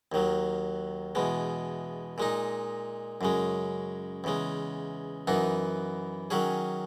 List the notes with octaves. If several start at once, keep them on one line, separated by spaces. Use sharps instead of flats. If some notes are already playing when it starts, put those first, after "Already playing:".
D#2 D#3 F#3
E2 B2 G#3
A#2 G#3 D#4
F#2 C#3 G#3
E2 C#3 G#3
F#2 E3 B3 D#4
D#3 F#3 C#4 G#4